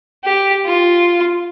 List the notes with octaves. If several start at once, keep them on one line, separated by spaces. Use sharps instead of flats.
G4
F4